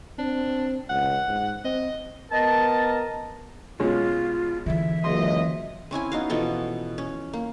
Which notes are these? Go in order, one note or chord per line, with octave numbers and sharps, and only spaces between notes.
C4 D4
C#2 F#5
G#2
C4 D#5
B3 A#4 D#5 A5
B2 G#3 C#4 F4
D3 E3 E5
F#1 C#2 D#5 C6
C4 C#4 E4 G#5
B3 D#4 F#4 F5
B2 E3 F3 A4
C#4
A#3